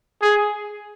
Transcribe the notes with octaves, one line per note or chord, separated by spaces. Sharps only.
G#4